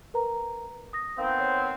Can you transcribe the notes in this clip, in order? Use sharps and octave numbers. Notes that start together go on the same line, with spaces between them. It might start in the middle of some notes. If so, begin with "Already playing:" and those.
A#4 B4 A#5
D#6 A#6
D#3 B3 C4 F5
C#5